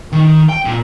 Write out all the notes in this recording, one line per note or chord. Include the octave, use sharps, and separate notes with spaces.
D#3
G5
A#2